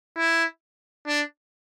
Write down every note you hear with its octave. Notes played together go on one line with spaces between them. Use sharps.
E4
D4